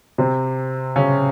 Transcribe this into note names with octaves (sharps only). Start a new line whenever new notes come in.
C3 C4
C#3 C#4